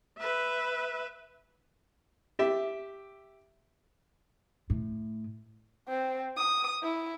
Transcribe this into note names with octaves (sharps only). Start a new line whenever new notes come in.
B4 E5
G4 E5
A2
C4
D#6
E4